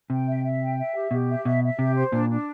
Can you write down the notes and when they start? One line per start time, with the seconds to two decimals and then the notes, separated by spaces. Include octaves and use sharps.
0.10 C3 G5
0.27 E5
0.43 E5
0.61 G5
0.78 E5
0.94 G4
1.11 B2 G4
1.28 E5
1.45 B2 E5
1.62 E5
1.79 C3 G4
1.96 C5
2.12 A#2 D4
2.29 D4